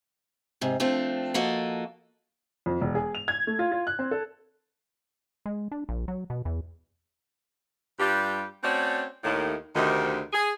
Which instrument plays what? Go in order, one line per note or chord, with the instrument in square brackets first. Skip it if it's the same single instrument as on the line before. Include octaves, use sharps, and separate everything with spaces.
[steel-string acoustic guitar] G#2 C3
F3 A3 C4 D4
F3 A#3 F#4 A4 D#5
[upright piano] F2
E1
G#4
F7
G#6
A3
F4
F4
F#6
C4
A4
[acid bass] G#3
D4
A#1
F#3
B2
E2
[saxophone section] G2 G3 D4 F4 G4
A3 C4 C#4 F#4 C#5 D5
D#2 A2 D#3
D2 C3 D#3
G#4